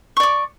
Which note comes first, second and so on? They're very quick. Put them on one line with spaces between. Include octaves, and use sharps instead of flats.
C#6 D5 D6